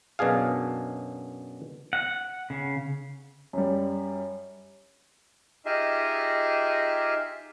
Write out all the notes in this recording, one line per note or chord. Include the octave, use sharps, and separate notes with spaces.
F#2 B2 D4 G#4 F5
F#5
C#3
F#2 G3
D#4 F4 G4 G#4 D#5 E5